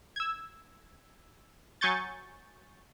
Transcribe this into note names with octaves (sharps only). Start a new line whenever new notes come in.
E6 G#6
F#3 G#5 C#6 G6 A6